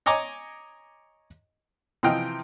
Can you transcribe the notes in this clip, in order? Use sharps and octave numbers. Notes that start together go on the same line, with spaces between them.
C#5 D#5 G#5 A#5 D6
C3 E3 F3 D#5 G5 F6